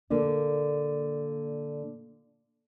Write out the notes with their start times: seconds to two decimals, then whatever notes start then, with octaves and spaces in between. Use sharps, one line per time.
0.10 A#2 D3 A#3 D4